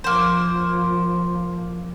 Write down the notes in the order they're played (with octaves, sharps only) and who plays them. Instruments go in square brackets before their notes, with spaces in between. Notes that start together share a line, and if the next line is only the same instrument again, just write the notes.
[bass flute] F3 [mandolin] A#3 C5